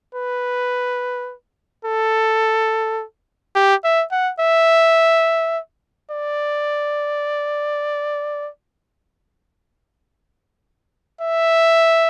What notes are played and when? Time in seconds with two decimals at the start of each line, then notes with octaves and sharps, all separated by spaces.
0.15 B4
1.85 A4
3.55 G4
3.84 E5
4.12 F#5
4.40 E5
6.11 D5
11.21 E5